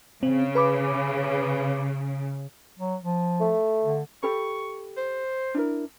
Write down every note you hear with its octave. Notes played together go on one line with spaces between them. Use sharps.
C#3 C4
B4 B5 D6
F#3
F3
A3
D3
G4 A4 B5 C#6
C5
D4 E4 A#4